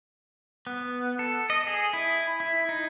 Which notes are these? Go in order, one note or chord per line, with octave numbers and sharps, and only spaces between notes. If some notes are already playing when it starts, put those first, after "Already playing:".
B3
A4
D#5
G#4
E4
E4
D#4